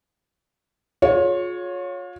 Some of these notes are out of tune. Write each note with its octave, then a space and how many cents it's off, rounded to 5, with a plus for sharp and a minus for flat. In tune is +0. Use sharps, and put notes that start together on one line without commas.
F4 +35 G#4 +30 C#5 +0